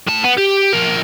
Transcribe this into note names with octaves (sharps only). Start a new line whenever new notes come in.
A2 A5
B3
G4
F3 A#4